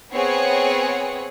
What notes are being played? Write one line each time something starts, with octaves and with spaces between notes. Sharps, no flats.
B3 C4 G#4 C#5 F#5